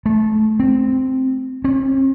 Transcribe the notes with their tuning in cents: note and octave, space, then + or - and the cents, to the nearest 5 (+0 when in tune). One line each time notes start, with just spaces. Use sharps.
A3 -20
C4 -5
C4 +45